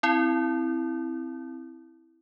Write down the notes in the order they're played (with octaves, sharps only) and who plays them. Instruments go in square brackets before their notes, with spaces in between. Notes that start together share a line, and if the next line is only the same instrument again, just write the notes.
[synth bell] C4 E4